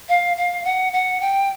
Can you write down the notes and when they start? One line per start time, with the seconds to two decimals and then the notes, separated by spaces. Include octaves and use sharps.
0.09 F5
0.37 F5
0.65 F#5
0.93 F#5
1.21 G5